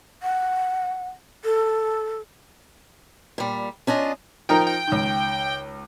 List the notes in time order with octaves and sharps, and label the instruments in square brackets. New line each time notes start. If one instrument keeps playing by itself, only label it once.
[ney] F#5
A4
[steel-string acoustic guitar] A#2 G3
C#4 D4 F4 D#5
[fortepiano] F3 D#4 A#4 [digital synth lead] G5
[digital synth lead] G5
[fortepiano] C#2 D#3